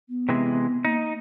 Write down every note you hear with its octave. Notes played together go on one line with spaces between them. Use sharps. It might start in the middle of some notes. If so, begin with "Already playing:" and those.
B3
C3 E3 G#3
A#3 D#4